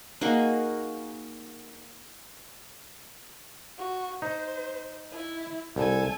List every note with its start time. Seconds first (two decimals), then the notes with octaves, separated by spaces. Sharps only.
0.21 A#3 D#4 F#4 G#4
3.77 F#4
4.22 D#4 C5
5.11 E4
5.76 C2 A4 G#5